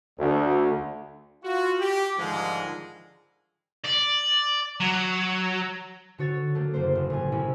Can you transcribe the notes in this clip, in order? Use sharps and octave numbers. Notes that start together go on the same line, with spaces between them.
D2
F4 F#4
G4
G#2 D3 D#3 F3 G3 G#3
D5
F#3
D3 F#4 C#5 A6
A3 A#3
F#1 A#3 C5
G1
A1 G#5
C3 C#4 E4 A#4